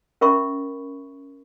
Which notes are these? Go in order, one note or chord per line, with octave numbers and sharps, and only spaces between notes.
C#4 A#4 E5 B5 C#6